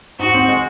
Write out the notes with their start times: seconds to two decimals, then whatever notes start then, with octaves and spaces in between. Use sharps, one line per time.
0.19 G#2 F#4
0.34 C4
0.48 G#3